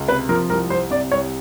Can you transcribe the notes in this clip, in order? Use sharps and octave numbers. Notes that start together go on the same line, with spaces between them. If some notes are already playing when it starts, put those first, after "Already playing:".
Already playing: C#2
C3 B4
F3 A#4
C2 A#4
C2 C5
C3 D5
C2 C#5